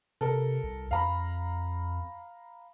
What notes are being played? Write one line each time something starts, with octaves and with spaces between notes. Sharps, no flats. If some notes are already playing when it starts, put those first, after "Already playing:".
C3 A4 A#4
C2
F2 F5 A#5 B5